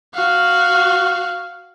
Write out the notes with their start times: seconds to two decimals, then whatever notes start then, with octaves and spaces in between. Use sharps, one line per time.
0.14 F#4 F5